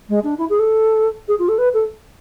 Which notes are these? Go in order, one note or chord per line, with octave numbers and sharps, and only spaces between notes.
G#3
D4
E4
G#4
A4
G#4
F4
A4
B4
A4